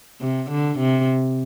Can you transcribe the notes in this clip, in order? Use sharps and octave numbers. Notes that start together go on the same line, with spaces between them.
C3
D3
C3